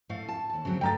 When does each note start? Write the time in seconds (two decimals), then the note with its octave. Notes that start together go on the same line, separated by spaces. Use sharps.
0.09 A2 A3 F5
0.28 A5
0.49 D#2 A5
0.65 C#3 F#3 C4
0.81 G2 A3 G5 A#5 A6